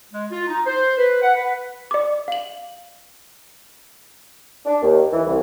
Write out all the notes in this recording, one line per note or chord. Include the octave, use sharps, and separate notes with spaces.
G#3
F4
D#4
C5
B4
F#5
B4
D5 D6
F5 F#7
D4
D#2
E3
C2